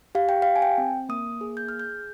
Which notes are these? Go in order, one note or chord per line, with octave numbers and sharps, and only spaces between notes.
G4 F5
G5
F5
G4
G#5
G5
C4
A#3 D#6
G#4
G6
G#4 F6
G6